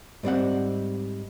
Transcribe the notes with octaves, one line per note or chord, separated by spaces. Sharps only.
G#2 G3 C4 F#5